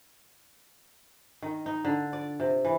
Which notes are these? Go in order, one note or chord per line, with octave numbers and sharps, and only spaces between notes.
D#3
D#4
D3
D5
C3
E3